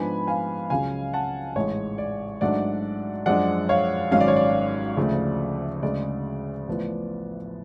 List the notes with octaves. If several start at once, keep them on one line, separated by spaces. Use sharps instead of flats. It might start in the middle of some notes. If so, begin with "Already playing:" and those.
Already playing: G#2 F3 B3 D4 G#5 B5
F5 G#5
C#2 C#3 F#3 C#4 F5 G#5
F#5 A5
A1 G#2 G#3 C#5
D5
G#2 F#3 A3 D4 D5 F#5
F#2 F3 G#3 D4 D5 F#5
C#5 F5
G#1 G#2 F#3 C#4 F5
D5
C#5
D5
D2 C#3 F3 A3
D2 C#3 G#3 D5
A1 A2 F3 B3